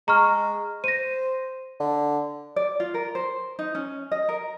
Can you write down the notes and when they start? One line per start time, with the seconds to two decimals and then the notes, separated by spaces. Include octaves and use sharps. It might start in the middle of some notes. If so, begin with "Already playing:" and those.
0.08 G#3 A#5 C#6 F6
0.84 C5 A#6 D#7
1.80 D3
2.56 D5
2.80 F4
2.94 A#4
3.15 C5
3.59 D#4
3.75 C#4
4.11 D#5
4.29 A#4